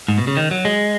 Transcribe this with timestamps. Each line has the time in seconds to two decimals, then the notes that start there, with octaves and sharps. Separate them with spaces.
0.08 G#2
0.18 B2
0.27 C#3
0.37 D#3
0.51 F#3
0.65 G#3